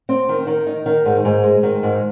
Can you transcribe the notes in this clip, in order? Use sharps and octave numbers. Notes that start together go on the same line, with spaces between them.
C4
D#3
D#3
D#4
D#3
G#2
G#2
G#3
D#3
G#2